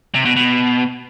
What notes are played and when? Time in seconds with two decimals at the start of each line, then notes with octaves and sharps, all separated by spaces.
0.14 C3
0.25 B2
0.36 B2